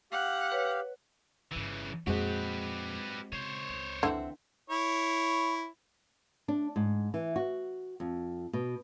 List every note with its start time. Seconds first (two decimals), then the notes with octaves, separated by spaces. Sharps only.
0.12 G4 F5 F#5
0.52 B4 C#5
1.52 G1 G2 C#3 E3
2.07 F2 A#2 G#3 C4 F#4 G4 B4
3.32 C#3 C5 C#5
3.69 C#2
4.03 D3 E3 C4 E5 F#5
4.70 E4 C#5
6.48 D4
6.76 G#2
7.14 E3
7.36 F#4
8.00 F2
8.53 B2